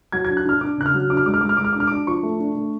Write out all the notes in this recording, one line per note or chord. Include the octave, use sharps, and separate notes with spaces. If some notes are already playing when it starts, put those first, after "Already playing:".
F#3 G#6
G#6
D4
F#6
D4 F6
D4 D6
C#3 F#6
F6
F#3
D4 D6
F6
G#3 D6
F6
G#3 D6
F6
G#3 D6
F6
D4 D6
F6
D4 D6
F3 C#6
A3
D4
A3